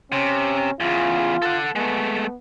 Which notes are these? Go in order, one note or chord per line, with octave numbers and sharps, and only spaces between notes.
C3 C#4
E2 C#3 F4
A4 F#5
G#3 A3 B3